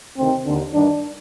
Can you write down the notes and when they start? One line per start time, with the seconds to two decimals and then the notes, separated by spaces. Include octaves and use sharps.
0.17 D2 C3 D#3 C4
0.46 D#2 D3
0.74 G2 D#3 D4